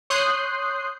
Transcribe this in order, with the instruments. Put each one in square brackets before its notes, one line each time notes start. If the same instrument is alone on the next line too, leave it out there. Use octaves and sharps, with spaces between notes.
[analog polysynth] C#5 C6 D#6 F#6 G6 C7